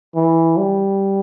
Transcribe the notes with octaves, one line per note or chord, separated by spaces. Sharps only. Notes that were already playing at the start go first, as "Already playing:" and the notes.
E3
G3